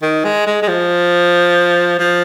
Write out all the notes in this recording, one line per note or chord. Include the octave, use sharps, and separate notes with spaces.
D#3
G#3
G#3
G#3
F3
F3